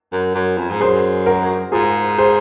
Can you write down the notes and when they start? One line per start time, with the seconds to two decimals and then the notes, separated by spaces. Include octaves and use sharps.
0.12 F#2
0.35 F#2
0.57 F2
0.70 G#2
0.81 F#2 G#4 C5
1.26 F#4 A#4
1.72 G#2 F4 G#4
2.18 G#4 C5